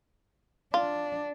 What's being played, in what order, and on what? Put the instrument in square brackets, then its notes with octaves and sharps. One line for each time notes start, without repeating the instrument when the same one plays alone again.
[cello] D4 [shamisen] F4